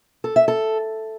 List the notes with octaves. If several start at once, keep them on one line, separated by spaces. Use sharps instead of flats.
A4
E5
A4